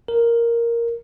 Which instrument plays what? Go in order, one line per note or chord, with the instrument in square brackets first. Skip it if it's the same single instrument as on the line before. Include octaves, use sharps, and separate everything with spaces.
[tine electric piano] A#4